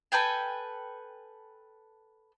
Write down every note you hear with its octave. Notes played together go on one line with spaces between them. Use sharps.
A4 B4 G5 G#5